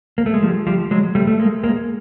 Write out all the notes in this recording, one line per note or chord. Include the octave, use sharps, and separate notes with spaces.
A#3
A3
G#3
F3 G3
F3 G3
F#3 G#3
G3 A3
A3
G#3 A#3
G#3 A#3